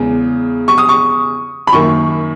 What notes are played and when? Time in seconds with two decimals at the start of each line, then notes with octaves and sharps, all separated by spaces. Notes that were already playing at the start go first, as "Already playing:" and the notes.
Already playing: E2 C#3 G#3
0.68 C#6
0.78 D#6
0.89 C#6
1.67 B5
1.73 F#2 D#3 A#3 C#6